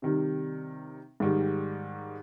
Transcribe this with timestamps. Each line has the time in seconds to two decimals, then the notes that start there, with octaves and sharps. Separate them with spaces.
0.02 C3 D#3 G3
1.20 G#2 D#3 G3